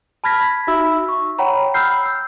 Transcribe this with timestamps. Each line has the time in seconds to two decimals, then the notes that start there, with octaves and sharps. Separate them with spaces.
0.24 A5 B5 F6 G#6 A#6 B6
0.67 D#4 F#4 E5 B5 E6
1.08 C#6
1.38 C#5 F#5 G5 A#5 B5
1.74 B5 E6 F6 G6 C7
2.05 E6